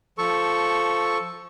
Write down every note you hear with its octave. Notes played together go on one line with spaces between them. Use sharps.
F3 A4 C#6